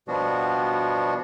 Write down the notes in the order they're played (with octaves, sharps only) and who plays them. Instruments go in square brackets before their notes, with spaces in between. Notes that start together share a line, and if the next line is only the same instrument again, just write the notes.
[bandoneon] B2 F3 G3 B3 D4 F#4